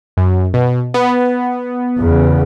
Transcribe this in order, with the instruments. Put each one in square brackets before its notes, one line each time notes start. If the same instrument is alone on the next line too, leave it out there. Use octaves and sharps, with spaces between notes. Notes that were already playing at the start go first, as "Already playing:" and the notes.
[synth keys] F#2
B2
B3
[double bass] E2 C#3